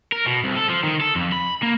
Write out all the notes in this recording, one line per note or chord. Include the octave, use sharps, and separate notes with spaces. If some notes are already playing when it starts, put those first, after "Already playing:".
A#4
B2
C2
A4
F3
D#3
A4
F2
B5
A#3